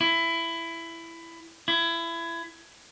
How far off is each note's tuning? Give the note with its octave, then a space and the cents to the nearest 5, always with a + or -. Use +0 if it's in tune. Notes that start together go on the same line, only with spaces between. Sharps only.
E4 +15
E4 +25